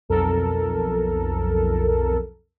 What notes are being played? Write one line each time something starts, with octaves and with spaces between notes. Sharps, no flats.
B1 F2 A4 A#4